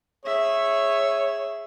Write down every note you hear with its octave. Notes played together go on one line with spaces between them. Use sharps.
G#4 C#5 E5